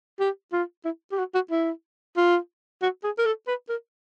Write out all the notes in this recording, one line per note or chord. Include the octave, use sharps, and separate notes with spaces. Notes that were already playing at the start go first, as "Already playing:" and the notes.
G4
F4
E4
G4
F#4
F#4
E4
F4
F#4
G#4
A#4
A4
B4
A#4